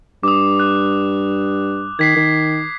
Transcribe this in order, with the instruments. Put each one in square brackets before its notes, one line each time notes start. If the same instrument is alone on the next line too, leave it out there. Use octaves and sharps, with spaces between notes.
[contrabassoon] G2 [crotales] D6 D#6
[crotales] F#6
[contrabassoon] D#3 [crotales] G#6 B6 C7
[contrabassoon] D#3